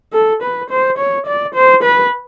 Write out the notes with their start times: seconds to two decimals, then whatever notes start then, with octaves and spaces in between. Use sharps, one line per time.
0.13 A4
0.43 B4
0.71 C5
0.98 C#5
1.26 D5
1.55 C5
1.83 B4